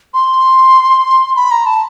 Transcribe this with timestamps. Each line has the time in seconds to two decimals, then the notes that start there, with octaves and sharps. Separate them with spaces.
0.14 C6
1.36 B5
1.51 A#5
1.66 A5